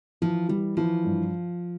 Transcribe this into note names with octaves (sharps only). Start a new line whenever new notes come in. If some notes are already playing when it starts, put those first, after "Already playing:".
E3 F3
E3 G3
E3 F3
G2